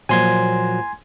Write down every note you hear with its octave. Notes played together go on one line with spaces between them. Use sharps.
A#2 F3 F#3 G#5 C6 G#6